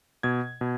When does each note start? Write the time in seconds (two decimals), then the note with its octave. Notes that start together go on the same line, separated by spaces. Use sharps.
0.23 B2 G#6
0.61 B2